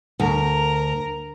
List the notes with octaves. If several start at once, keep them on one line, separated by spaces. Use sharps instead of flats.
D2 A#4